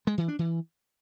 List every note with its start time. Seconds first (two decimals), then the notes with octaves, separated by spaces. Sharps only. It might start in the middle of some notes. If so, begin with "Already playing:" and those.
0.07 G#3
0.18 E3
0.28 D4
0.39 E3